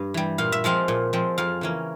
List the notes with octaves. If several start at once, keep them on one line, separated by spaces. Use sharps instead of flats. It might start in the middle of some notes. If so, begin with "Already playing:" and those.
Already playing: G2
E3 G3
A#2 F5
E5
F3 G#3 C4 F5
A#2
F3 G#3 C4
F2 F5
C#3 E3 A#3 C#4